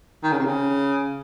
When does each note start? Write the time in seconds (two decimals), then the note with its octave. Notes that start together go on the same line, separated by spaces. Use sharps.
0.23 D#3
0.32 C#3
0.39 C3
0.45 C#3